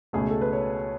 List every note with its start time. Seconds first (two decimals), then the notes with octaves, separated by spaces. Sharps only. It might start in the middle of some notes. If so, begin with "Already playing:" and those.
0.13 C#2 B2 A3 G#4
0.30 A4
0.41 B4
0.53 C#5